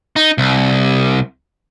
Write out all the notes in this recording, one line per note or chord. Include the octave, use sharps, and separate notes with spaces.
D#4
C2